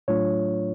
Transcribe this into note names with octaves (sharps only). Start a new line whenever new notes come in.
A2 F#3 A3 D4 F4 C#5